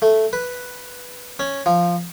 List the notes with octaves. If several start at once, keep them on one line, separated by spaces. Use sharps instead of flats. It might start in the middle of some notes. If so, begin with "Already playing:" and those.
A3
B4
C#4
F3